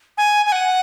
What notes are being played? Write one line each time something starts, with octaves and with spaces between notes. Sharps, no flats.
G#5
G#5
F#5